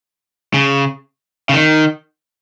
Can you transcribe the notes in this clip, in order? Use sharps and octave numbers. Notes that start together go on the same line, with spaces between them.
C#3
C#3
D#3